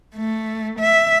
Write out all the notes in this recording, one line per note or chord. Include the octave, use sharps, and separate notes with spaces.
A3
E5